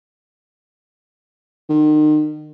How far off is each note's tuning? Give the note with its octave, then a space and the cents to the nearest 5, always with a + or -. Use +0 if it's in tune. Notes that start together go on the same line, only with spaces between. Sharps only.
D#3 -35